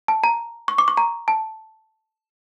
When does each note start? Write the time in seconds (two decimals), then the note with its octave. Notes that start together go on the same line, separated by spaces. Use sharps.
0.08 A5
0.24 A#5
0.68 C#6
0.78 D6
0.88 C#6
0.97 A#5
1.28 A5